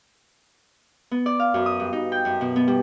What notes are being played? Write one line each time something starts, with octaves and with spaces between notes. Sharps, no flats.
B3
D5
F5
F#2
D#6
G2
D#4
G5
F#2
B2
B3
G3